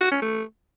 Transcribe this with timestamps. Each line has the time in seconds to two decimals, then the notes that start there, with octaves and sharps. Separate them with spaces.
0.01 F#4
0.12 C#4
0.22 A3